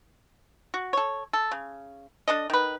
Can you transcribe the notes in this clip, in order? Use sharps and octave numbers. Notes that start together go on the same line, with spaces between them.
F#4
A4 C#5
A4
C#3
D4 A4 D#5
D#3 B4